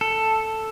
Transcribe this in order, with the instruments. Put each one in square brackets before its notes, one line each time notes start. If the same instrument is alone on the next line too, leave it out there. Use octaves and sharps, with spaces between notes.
[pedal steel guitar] A4